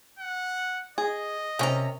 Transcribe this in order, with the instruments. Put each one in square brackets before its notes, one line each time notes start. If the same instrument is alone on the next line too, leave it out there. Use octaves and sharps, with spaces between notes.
[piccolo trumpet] F#5
[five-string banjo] G#4 [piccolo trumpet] D#5
[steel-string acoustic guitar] C3 A#5 [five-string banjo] C#4 A#4